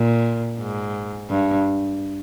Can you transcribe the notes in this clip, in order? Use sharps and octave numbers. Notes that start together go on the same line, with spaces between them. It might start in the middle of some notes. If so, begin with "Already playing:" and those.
Already playing: A#2
G#2
G2